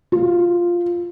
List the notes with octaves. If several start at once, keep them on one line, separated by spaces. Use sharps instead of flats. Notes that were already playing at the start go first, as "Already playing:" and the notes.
F4